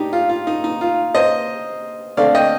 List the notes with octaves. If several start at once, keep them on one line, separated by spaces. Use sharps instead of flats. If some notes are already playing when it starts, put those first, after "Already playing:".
Already playing: A2 D4 D#4 G4
F4
F4
D#4
D#4
F4
C5 D#5
D3 A3 C4 D5 F5
D#5 G5